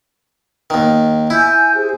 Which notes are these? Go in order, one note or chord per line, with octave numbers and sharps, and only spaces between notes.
D#2 D#3
E4 G#5 G6
G4 G#4 C5